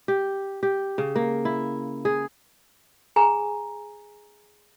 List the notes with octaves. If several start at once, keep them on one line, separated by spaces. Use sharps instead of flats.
G4
G4
C#3
A#3
E4
G#4
G#4 G#5 A#5